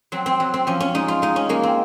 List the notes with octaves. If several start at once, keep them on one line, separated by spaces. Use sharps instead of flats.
F#3 C4
C4
F#3
C4
F3 C#4
C#4
G#3 D#4
F4
G#3 D#4
C#4
G#3 A#3
C4